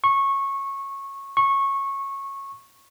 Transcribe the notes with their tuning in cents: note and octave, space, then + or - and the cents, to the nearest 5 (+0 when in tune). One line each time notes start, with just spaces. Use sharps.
C#6 -15
C#6 -15